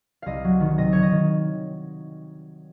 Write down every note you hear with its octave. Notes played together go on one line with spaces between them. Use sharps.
C2 D#5 F5
F#3
D#3
C3 D#5
D#3 C#5
D#5
D#3